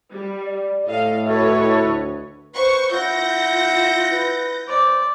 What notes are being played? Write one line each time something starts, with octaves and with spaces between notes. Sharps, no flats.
G3
D5
A2 A4 D#5 F5
E4 F#4 A4 B4 C#5 D#5
D2
B4 C5 C#6
E4 F4 F#5 G6 A#6
B4
C5 D5